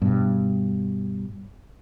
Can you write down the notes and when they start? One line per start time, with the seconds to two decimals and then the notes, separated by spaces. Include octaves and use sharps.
0.02 G2 B2